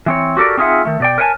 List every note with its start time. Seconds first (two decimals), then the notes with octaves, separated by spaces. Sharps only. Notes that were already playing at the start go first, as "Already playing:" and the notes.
0.06 E3 C4 C#5
0.37 F#4 G4 A4 A#4 D5
0.57 C4 D#4 F4 G#4 E5 F#5
0.85 D#3 A3
1.00 B2 D5 G5
1.18 A#4 B4 C#5 F#5 G#5 A5